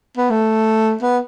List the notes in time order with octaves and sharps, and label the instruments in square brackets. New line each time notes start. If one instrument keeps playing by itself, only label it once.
[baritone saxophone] B3
A3
B3